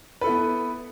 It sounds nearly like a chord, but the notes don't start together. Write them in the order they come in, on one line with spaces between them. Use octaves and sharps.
B4 A4 E4 B3